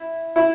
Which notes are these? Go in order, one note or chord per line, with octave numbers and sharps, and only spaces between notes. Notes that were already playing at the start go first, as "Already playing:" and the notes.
Already playing: E4
E4